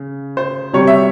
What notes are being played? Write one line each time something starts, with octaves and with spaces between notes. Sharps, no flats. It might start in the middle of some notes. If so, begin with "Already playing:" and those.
Already playing: C#3
C5
C3 G3 C#5
E5